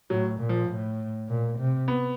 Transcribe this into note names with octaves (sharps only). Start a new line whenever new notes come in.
A2 F#3
A#2
F3
A2
A#2
C3
B3